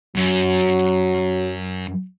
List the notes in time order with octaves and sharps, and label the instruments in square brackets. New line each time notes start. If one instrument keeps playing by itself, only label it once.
[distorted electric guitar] F#2 [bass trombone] F#3